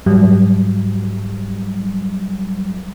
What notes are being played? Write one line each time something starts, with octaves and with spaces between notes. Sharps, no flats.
G#2 F#3 G3